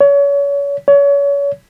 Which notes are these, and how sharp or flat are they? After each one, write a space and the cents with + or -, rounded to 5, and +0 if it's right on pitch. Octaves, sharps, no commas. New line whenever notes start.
C#5 +30
C#5 +30